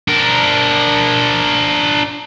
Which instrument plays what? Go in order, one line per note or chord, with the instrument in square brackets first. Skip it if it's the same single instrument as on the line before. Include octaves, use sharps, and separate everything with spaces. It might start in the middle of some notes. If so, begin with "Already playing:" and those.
[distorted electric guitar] D4 A#4